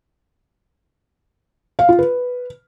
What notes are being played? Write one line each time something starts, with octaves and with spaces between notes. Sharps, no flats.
F5
F4
B4